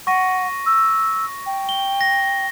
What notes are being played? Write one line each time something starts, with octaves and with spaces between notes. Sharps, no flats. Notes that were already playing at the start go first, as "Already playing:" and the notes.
F#5 C#6 A#6 D#7
E6
G5
G7
A#6